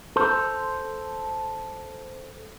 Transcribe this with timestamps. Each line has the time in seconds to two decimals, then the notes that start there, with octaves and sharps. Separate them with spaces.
0.16 A4 C5